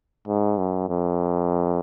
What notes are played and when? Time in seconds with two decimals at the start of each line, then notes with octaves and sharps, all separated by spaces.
0.27 G#2
0.58 F#2
0.89 F2